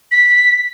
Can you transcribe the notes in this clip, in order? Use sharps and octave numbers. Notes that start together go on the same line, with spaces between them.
B6